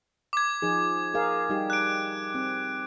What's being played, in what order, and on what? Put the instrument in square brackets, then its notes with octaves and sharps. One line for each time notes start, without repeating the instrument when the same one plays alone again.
[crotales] D6 G#6
[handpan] F3 D#4 G#4
G#4 A#4 F5
G3 D#4 G4
[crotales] F#6 D7
[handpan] C4